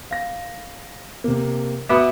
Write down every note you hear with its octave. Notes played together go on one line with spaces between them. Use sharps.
F5 A#6
C3 A#3
B2 B3 E5 D6 D#6